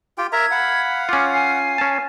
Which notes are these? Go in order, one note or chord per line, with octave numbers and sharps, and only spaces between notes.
F4 G4 G5
A#4 E5 A#5 G#6
F5 F#5 B5
C#4 F4 D6
G#5 C7
C#4 A5